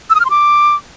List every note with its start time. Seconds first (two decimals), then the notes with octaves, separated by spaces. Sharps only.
0.10 E6
0.15 D#6
0.20 F6
0.25 C6
0.30 D6